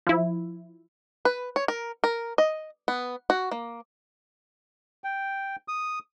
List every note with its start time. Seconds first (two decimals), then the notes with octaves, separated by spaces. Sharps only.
0.07 F3 E4
1.25 B4
1.56 C#5
1.68 A#4
2.04 A#4
2.38 D#5
2.88 B3
3.30 F#4
3.51 A#3
5.04 G5
5.68 D#6